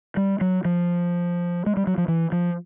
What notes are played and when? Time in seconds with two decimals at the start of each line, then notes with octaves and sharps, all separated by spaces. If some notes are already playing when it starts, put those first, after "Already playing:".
0.17 G3
0.41 F#3
0.65 F3
1.66 G#3
1.77 G3
1.87 F#3
1.98 F3
2.08 E3
2.32 F3